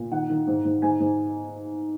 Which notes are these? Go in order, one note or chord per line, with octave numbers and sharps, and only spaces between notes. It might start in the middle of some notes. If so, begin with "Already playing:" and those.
Already playing: A#2
D#3 F#5
D#3
G#2
G#2
G#2 G#5
G#2